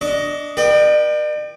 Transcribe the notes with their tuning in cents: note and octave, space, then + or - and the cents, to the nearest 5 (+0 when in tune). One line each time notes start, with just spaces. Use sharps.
D4 +0 D#5 +5 C#6 +40
B4 -45 D5 +45 G5 +0